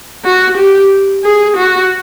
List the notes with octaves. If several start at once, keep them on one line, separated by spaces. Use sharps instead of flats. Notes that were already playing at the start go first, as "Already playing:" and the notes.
F#4
G4
G#4
F#4